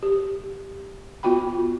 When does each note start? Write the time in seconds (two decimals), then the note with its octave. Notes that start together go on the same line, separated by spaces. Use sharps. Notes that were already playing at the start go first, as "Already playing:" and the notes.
0.03 G4
1.23 B3 F4 F#4 G5 B5